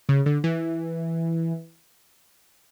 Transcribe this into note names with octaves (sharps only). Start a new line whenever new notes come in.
C#3
D3
E3